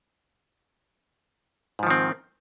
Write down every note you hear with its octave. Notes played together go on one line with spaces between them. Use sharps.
G#2 D#3 F3 C4